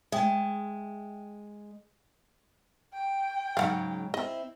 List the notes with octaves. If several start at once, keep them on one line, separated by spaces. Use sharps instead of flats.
G#3 E5 G5
G5
G#2 C#3 F#3 F5 F#5
C4 E4 D#5